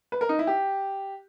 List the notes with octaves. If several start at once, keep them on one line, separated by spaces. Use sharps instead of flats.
B4
A#4
D#4
E4
G4